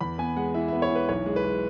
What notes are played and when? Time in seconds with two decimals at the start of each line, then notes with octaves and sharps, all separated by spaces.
0.01 E2 B5
0.18 B3 G#5
0.36 G#3 F#5
0.54 E3 E5
0.68 B3 E5
0.82 C#5
0.90 E3
0.96 B4
1.09 B1 C#5
1.26 G#3
1.36 B4
1.44 G#3